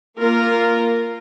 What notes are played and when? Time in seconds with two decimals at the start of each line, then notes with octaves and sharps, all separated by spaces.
0.19 A#3 F4 A#4